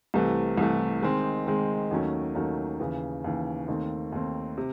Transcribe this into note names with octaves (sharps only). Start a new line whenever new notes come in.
C2 C3 E3 A3
C2 C3 E3 A3
D#3 G#3 C4
D#3 G#3 C4
D#2 D#3 F#3 A3 C#4
D#2 D#3 F#3 A3 C#4
D#2 C#3 E3
D#2 C#3 E3
D#2 D#3 A3 C4
D#2 D#3 A3 C4
C3